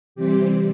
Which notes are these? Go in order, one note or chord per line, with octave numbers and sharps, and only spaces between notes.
C3 E3 G3 C4 G4